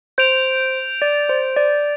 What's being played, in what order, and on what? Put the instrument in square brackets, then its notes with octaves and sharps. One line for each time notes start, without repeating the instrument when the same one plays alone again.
[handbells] C5 [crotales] G6 D7 F7
[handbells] D5
C5
D5